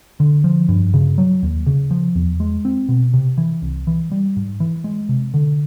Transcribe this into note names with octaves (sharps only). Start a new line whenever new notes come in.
D3
F3
G2
C#3
F#3
D#2
C#3
F3
E2
G#3
C4
B2
C3
E3
C2
E3
G3
G#2
E3
G#3
C3
D3